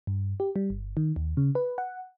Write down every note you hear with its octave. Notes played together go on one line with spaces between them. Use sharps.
G2
G4
G3
G1
D#3
D#2
C#3
B4
F#5